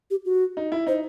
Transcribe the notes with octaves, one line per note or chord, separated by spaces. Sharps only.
G4
F#4
D#4
E4
D#4 C5